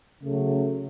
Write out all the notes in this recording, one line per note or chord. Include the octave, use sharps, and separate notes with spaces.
C#3 F#3 A3